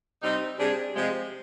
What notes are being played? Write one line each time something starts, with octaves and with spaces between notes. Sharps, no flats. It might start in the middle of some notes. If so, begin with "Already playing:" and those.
C3 G3 C4 D#4
C3 G3 D4 G#4
C3 F3 G#3